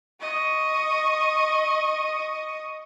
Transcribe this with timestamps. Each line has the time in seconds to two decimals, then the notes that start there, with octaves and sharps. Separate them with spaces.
0.21 D#5 C#6